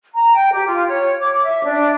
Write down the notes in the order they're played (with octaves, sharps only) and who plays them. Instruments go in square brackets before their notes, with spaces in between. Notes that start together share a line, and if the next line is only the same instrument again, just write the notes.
[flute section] A#5
G5
G4
F4
C#5
D6
E5
D4